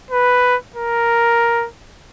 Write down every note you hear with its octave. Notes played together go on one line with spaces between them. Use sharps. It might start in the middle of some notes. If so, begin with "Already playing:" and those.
B4
A#4